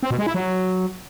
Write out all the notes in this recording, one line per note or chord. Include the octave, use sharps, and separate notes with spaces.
C4
B2
G#3
E4
F#3